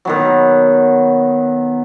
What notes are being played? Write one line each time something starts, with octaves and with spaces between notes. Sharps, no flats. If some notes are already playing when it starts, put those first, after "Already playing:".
B2 D#3 F#3